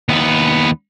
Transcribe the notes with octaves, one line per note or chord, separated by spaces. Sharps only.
D#2 B3